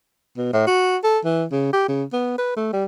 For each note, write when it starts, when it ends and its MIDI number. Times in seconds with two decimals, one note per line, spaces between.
0.37 0.49 47
0.53 0.67 45
0.67 0.97 66
1.04 1.19 69
1.25 1.45 52
1.52 1.71 49
1.73 1.87 67
1.88 2.04 49
2.13 2.35 59
2.38 2.52 71
2.56 2.70 57
2.73 2.85 55